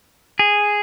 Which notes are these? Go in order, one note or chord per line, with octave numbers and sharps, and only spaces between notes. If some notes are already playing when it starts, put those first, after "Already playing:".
G#4